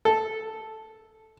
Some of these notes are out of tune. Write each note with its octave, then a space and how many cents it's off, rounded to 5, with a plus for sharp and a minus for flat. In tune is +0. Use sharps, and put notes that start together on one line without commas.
A4 -5